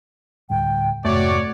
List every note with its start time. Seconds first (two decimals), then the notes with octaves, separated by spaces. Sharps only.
0.50 D2 A2 G3 G5
1.05 F2 G#2 C3 A3 F#4 C#5 D5